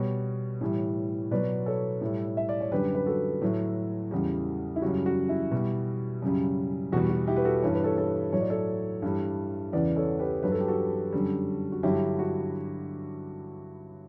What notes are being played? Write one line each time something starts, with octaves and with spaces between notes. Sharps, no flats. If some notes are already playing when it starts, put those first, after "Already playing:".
Already playing: B2 G3 C#5
A2 E3 G3
B2 F#3 B4 D5
A4 C#5
A2 G3
E5
D5
C#5
F#2 D3 G3 G4 B4
B4
F#4 A4
A2 F#3
E2 C#3 E3 G3
E4
F#2 C#3 G3 F#4
F#4
E4
B2 G3
F#2 C#3 G3
E2 B2 G3 F#4
F#4
E4 G4
B4
F#4 A4
G2 E3 G3 C#5
B4
A4 C#5
A4 C#5
A2 F#3 C#5
D5
A4 C#5
G2 E3 G3
E2 C#3 E3 B4 D5
A4 C#5
G4 B4
G2 F#3 B4
A4
G4
F#4 A4
F#2 D3 G3
F#4
G2 D3 F#3 E4 G4
F#4